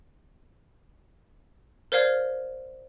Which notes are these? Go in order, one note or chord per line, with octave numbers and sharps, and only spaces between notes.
A#4 C5 D5 F5 F6 G#6